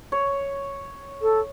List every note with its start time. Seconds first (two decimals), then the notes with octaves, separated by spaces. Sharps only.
0.12 C#5
1.22 A4